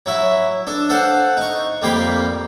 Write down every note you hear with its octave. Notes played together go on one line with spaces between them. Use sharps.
F#3 E4 E5
D4 A4
A4 C5 F5 F#5
D#4 C#6
F2 G3 A#3 F5 G5 B5